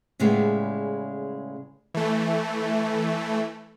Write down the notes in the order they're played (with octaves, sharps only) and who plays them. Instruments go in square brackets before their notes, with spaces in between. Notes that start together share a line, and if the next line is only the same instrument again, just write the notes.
[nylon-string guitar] A2 C#3 G3 G#3 B3
[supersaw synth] E3 A3